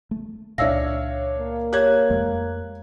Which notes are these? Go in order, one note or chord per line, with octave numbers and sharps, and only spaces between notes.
A3
C#2 A#2 D4 C#5 E5 F5 E6 A#6
A#3
G4 C#5 F#6 G#6
F2 G#3 A3